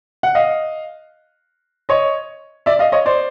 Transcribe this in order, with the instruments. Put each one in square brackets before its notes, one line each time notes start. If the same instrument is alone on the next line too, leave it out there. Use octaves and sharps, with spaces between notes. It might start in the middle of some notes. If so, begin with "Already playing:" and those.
[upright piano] F#5
D#5 F5
C#5 D#5
D5 E5
D#5 F5
C#5 D#5
C5 D5